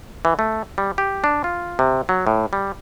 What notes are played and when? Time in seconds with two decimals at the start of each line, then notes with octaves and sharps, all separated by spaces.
0.25 E3
0.39 A3
0.78 G3
0.98 G4
1.24 D4
1.44 F4
1.79 C3
2.09 F#3
2.27 A2
2.53 G3